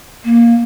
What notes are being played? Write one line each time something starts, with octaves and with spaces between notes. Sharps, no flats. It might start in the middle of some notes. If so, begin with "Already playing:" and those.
A#3